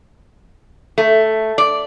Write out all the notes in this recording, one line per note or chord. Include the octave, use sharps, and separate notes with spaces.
A3
D5